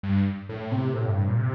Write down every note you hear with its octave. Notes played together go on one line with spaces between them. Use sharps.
G2
A2
C3
A2
G2
G2
A#2
C3